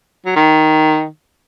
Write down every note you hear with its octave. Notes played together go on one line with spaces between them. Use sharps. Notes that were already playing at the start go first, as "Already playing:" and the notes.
F#3
D#3